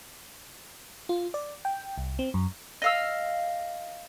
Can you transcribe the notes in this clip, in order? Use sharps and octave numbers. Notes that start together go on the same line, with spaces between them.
F4
D5
G5
C2
C4
F#2
D#5 F5 E6